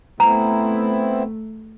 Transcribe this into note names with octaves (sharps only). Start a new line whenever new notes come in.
A3 B3 C4 E4 A#5